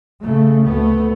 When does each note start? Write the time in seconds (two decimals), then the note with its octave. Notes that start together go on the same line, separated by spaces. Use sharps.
0.21 C#3 A3
0.66 D2 A3 B3